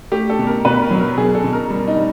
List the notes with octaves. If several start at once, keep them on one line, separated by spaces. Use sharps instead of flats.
A3 G4
A4
B2
A#4
B2 B4
A#4
F#3
A#4
B2 G#4
A4
B2
A#4
G3
D#4
G3